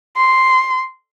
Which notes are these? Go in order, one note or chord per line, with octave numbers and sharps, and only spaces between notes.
C6